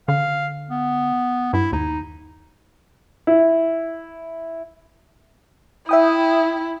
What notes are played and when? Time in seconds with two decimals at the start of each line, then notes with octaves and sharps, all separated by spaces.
0.08 D3 F5
0.70 B3
1.53 G2 E4
1.72 D#2 D#4
3.27 E4
5.89 E4 E5 G5 D#6